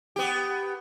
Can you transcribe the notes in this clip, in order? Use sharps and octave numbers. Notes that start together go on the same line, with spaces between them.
B3 G4